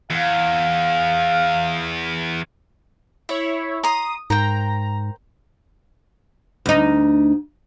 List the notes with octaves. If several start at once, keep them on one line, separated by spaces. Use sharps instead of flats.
E2 F5
E4 C#5 E5
A#5 C6 D#6
G#2 A#4 C5 G5 A#5
D2 D#4